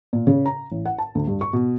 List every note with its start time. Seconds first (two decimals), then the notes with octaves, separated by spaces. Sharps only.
0.13 A#2
0.27 C#3
0.46 A#5
0.71 A1
0.85 F#5
0.98 A5
1.15 D2
1.27 G2
1.41 C#6
1.53 B2